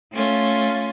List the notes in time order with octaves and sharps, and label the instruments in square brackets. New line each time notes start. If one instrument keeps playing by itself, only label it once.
[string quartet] A3 C#4 F4